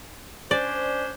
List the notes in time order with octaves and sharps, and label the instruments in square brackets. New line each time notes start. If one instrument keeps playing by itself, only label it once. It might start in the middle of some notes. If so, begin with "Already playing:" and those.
[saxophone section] C#4 D4 C5 [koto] D5